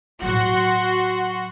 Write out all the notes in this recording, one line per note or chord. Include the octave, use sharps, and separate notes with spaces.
A2 F#3 F#4 F#5 C6